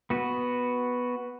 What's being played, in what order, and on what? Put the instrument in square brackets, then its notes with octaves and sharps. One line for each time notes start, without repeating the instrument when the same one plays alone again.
[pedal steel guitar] B3 F#4